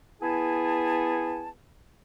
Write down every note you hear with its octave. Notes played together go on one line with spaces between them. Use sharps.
B3 E4 G#4 G#5 A5